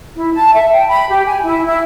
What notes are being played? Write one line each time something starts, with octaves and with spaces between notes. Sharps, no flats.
E4
A5
E5
G5
B5
G4
G#5
E4
E4